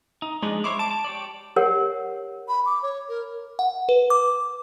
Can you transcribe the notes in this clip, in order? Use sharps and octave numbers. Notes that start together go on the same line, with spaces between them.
D#4
F3 G#3 D4 D#4
E4 C5 C#5 D6
A5 D7
A5
G4 C#5 D5
G4 A#4 C#5 F#5
B5
D6
C#5
A#4
F#5
B4
D6